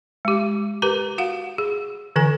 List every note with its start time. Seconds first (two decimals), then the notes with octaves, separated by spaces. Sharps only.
0.25 G#3 G4
0.82 G4 A#4 B4 A#5
1.18 F#4 F5 F#5
1.58 G#4
2.16 D3 E3 A4 G#5